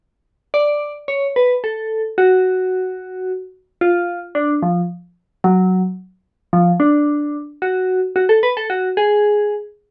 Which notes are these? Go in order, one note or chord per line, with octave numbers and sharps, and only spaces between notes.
D5
C#5
B4
A4
F#4
F4
D4
F3
F#3
F3
D4
F#4
F#4
A4
B4
A4
F#4
G#4